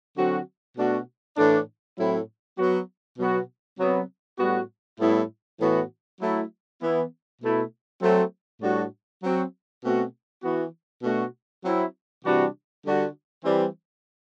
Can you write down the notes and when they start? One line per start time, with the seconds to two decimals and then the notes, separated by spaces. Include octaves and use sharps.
0.16 D3 F#3 C4 F#4
0.77 B2 A3 D4 F#4
1.37 A2 E3 A3 D4
1.97 A2 F#3 C4 E4
2.58 F#3 B3 F#4
3.19 B2 F#3 B3 F#4
3.78 C3 F#3 B3
4.39 A2 G3 B3 F#4
5.00 A2 G3 B3 E4
5.60 A2 E3 B3 F#4
6.20 F#3 A3 E4
6.81 E3 B3 E4
7.41 B2 A3 E4
8.01 F#3 A3 C4
8.62 A2 G3 D4 F#4
9.22 F#3 C4 F#4
9.82 B2 A3 C4 F#4
10.42 E3 B3 F#4
11.02 B2 A3 D4 F#4
11.63 F#3 C4 E4
12.24 C3 E3 G3 D4 F#4
12.84 D3 G3 D4 F#4
13.44 E3 G3 C4